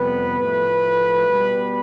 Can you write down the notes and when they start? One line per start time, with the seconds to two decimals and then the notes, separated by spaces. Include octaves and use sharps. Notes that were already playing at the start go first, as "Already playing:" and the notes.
Already playing: F2 C3 G3 B3 B4
0.39 A2 F3 A3
1.28 B2 G3 B3